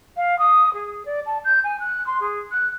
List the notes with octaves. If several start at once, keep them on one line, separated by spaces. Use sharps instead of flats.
F5
D#6
G#4
D5
A5
G6
G#5
F#6
C6
G#4
F#6